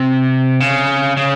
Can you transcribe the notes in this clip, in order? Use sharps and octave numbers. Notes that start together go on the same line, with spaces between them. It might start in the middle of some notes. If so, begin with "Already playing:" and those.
Already playing: C3
C#3
C#3